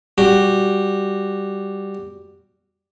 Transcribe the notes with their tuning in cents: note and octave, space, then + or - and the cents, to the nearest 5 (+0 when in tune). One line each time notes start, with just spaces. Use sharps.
G3 +0 F#4 +0